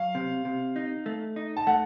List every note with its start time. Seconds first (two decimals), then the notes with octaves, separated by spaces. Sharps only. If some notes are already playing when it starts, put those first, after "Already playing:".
Already playing: F#3 F5
0.15 C3
0.45 C3
0.76 D#4
1.06 A3
1.36 D#4
1.57 A5
1.67 A3 F#5